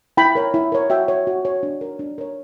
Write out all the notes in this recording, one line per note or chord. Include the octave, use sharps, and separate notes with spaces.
E4 G5 B5
A#4 C#5
E4
A#4 C#5
F#4 E5 G5
C#5
F#4
C#5
D4
A#4 C#5
D4
A#4 C#5